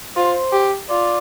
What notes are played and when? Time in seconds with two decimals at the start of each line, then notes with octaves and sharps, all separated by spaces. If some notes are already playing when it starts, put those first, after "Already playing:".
0.17 F4 C5
0.52 G4
0.89 F4 D5